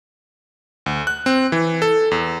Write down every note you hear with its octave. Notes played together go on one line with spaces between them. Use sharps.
D2
F#6
C4
E3
A4
E2